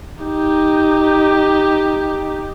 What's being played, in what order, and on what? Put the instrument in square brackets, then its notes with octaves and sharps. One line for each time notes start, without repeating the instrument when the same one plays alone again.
[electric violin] D#4 G4